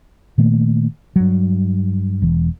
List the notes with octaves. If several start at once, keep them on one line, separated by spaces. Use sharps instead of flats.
A#2 D#3 A3 A#3
G2 F#3
E1 E3